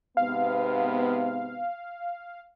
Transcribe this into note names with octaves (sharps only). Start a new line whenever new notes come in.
G#2 C3 B3 F5